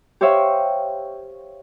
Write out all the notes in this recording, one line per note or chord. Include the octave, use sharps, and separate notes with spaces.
G4 C5 C#5 E5 F5 G5